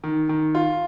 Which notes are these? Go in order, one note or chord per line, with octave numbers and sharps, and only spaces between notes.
D#3
D#3
F4